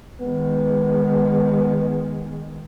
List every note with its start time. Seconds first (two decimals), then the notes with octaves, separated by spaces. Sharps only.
0.20 D#3 G#3 B3